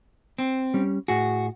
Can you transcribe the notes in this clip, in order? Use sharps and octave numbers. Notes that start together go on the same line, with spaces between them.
C4
G3 C#4
A2 F#4 G#4